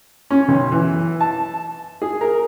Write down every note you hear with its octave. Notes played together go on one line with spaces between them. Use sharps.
C#4
B1
E3
A5
G#4
A#4